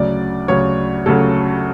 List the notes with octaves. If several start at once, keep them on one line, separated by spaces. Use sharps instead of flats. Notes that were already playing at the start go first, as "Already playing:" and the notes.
Already playing: D2 C#3 F#3 D5
D2 C#3 F#3 C#5
D2 C#3 F#3 A4